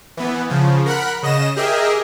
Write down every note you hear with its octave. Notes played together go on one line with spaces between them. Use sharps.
E3 B3
C#3 F3
A#4 F#5 B5 F#6
C#3 D#5 A#6 E7
G4 G#4 A#4 D#5 E5